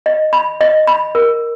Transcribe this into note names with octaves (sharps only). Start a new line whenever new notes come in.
D#5
B5
D#5
B5
A#4